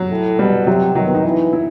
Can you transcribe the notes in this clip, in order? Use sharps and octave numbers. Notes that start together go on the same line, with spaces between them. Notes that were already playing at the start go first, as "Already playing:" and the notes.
Already playing: F#3
A2
B2 G3
C3 F#3
D#3 F#3
B3
D#4
E3
E4